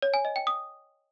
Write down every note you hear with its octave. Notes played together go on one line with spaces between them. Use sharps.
C#5
G#5
D#5
G5
D#6